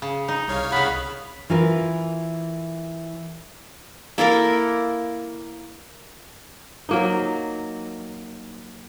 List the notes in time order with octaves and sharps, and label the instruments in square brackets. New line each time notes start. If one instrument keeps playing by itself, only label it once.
[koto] C#3
D#4
[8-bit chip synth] C2 C#5 F5
[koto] C#3 B3 [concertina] B5
[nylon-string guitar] E3 F4 A#4 B4
[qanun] A#3 E4 A4 A#4
[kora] F#3 A#3 D#4